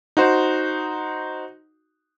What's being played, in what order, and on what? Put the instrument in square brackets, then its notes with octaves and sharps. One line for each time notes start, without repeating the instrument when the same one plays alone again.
[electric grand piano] D#4 F#4 C5